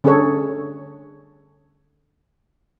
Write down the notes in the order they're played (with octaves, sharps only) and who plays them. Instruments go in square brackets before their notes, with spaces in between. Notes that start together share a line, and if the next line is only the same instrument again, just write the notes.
[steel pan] D3 C#4 D4 G#4 A4 C#5